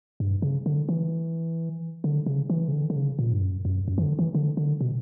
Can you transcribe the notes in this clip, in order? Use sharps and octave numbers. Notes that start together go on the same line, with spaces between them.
G2
C#3
D3
E3
D3
C#3
E3
C#3
D3
D3
C#3
A#2
G2
F#2
F#2
F#2
E3
D3
E3
D3
D3
B2